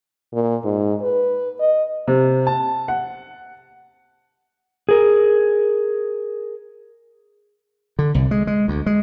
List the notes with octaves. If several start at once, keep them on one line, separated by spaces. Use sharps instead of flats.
A#2
G#2
B4
D#5
C3
A5
F#5
G#4 A#4
D3
C2
G#3
G#3
D2
G#3